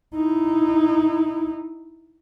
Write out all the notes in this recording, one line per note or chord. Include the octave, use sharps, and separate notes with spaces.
D#4 E4